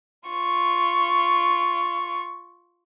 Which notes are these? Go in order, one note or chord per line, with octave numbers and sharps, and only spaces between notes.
F4 C#6